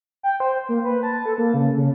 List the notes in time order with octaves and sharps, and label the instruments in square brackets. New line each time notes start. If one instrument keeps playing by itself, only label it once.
[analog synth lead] G5
C5
A#3
B4
A5
A4
A#3
C#3
C#3